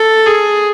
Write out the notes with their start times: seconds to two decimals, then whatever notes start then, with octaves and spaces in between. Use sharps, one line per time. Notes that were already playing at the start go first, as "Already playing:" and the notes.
Already playing: A4
0.26 G#4